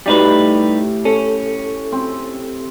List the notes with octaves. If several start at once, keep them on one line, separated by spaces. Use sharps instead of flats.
A2 G3 D#4 G4 B4
C#4 A4
C4